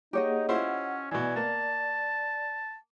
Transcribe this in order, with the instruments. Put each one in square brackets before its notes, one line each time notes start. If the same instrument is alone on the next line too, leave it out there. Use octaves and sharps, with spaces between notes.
[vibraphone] A#3 G#4 F#5 [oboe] D#4 [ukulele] G4 C#5 D#5
[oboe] C#4 [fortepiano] E4 F4 C5 [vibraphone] F#5
[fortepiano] B2 E3 [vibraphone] D5 [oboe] G#5
[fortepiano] A#3 [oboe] A5